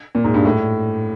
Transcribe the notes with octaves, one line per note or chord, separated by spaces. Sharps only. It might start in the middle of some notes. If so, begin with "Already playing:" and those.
A#2
G#2
G2
A2